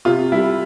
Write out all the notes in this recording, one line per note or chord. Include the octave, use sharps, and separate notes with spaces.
C3 F4
G3 E4